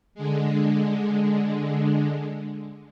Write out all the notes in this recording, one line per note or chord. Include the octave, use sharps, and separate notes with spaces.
D3 G#3